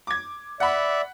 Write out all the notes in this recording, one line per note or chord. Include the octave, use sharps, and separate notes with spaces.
D6 G#6
D5 E5 F#5 B5